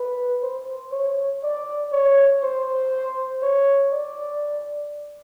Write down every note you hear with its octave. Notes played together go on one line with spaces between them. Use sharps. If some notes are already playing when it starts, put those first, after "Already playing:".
Already playing: B4
C5
C#5
D5
C#5
C5
C#5
D5